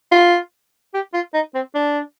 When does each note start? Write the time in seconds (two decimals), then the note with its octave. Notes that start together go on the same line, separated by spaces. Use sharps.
0.12 F4
0.94 G4
1.14 F4
1.34 D#4
1.55 C4
1.75 D4